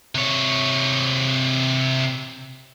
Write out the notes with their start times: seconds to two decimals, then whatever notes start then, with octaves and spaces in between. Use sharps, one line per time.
0.15 C3 C#5